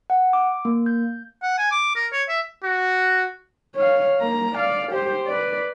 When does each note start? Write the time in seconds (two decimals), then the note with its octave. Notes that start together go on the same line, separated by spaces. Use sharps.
0.10 F#5
0.33 D6
0.65 A#3
0.86 G6
1.43 F#5
1.58 G#5
1.72 D6
1.96 A#4
2.13 C#5
2.29 E5
2.63 F#4
3.75 C#5 F5
4.20 A#3 A#5
4.55 D5 F5
4.92 G4 C5
5.26 B4 D5